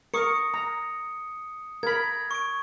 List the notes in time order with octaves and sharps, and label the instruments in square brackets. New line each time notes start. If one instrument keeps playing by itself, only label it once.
[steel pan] A#4 C#6 [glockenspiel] D#6 C#7
[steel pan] A#5
[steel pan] A#4 B5 [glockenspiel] G#6
[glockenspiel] C#6 D7